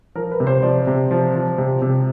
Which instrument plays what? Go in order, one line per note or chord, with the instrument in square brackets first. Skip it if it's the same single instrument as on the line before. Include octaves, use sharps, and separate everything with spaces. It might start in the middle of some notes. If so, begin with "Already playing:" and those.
[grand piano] F3 A#4
B4
C3
C5
F3 D5
C3
F3
F3
C3
C3